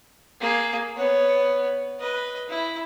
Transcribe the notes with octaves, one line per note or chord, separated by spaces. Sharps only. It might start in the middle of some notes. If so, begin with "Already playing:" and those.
A#3 G#4
B3 C#5
B4 D#5
E4